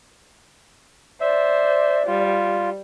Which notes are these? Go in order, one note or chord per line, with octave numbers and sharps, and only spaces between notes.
C5 D5 E5
G3 F4